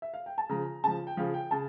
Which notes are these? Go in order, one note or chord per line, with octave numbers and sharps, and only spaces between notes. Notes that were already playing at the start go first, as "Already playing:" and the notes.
E5
F5
G5
A5
C#3 F3 A#5
C#3 F3 A5
G5
C#3 F3 F5
G5
C#3 A5